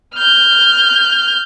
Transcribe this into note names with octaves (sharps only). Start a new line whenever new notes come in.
F6 G6